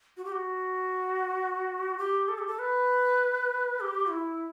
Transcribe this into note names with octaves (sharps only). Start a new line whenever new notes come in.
F#4
G4
F#4
G4
A4
G4
A4
B4
G4
E4